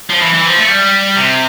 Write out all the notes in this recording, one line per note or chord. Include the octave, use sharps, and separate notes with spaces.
F3
E3
E3
F3
A3
G3
C3